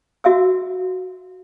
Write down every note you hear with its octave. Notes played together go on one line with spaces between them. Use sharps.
F#4 E5 F5 E6